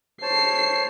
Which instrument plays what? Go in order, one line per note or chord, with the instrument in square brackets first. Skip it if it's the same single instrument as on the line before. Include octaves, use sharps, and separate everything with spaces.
[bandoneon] C5 C#5 A5 [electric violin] C7